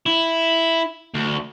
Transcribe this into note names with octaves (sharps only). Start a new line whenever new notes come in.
E4
D2